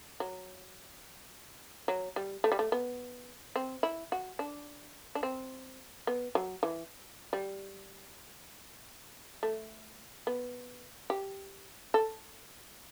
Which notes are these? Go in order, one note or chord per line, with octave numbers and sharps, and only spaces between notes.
F#3
F#3
G3
A3
G3
A3
B3
C4
E4
F#4
D4
D4
C4
B3
F#3
E3
G3
A3
B3
G4
A4